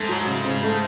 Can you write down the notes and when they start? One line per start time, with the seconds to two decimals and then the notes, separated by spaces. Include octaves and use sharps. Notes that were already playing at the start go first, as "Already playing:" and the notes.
Already playing: G#2 A3
0.09 F#3
0.27 C#3
0.45 C#3
0.63 A3